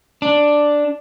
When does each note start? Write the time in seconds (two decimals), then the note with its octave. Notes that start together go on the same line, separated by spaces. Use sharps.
0.22 D4